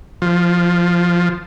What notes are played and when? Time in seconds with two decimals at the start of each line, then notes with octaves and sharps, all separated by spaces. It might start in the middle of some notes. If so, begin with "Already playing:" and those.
0.22 F3